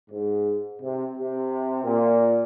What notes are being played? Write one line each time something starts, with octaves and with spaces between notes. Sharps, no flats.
G#2
C3
C3
A#2